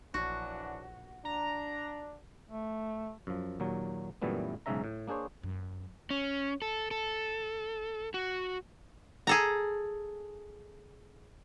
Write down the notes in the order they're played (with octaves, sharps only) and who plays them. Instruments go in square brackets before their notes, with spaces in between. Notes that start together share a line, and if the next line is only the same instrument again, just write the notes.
[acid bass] A#1 [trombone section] E3 F#3 D4 [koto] F#4
[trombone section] D4 [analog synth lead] A#5
[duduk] A3
[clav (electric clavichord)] F#2 F3
D#2 A#2 F#3
F#2 A#2 E3 G3 A3 B3
B1 G#2 C#3 C#4 E5 A#5
A2
A#3 D4 G#4 C5 C#5
[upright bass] F#2
[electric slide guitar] C#4
A4
A4
F#4
[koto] G#4 A4 A#5